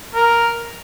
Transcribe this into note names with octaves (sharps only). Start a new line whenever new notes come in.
A#4